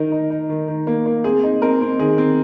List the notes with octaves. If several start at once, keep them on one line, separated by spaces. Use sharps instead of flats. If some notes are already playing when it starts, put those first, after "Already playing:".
Already playing: D#3 D#4 A#4
D#4
D#4
D#3
D#3
A#3
A#3
C4 G#4
D#4
C4 A#4
C4
D#3 G#4
C4